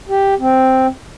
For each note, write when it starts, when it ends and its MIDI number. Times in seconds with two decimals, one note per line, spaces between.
0.09 0.34 67
0.39 0.87 60